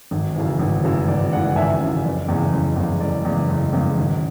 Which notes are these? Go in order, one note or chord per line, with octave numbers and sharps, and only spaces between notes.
G#1
F#2 C#3 E3
G#1
F#2 C#3 E3
G#1 D5
F#2 C#3 E3 D5 F#5
G#1 E5 G#5
F#2 C#3 E3
F#1 D5
E2 C#3
F#1
E2 C#3
F#1 D5
E2 C#3
F#1
E2 C#3
G#1